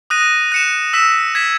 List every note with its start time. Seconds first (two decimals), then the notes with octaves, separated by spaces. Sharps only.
0.10 D#6 F#6 A#6 D#7
0.52 F#6 C#7 E7
0.93 E6 B6 E7
1.35 G#6 B6 E7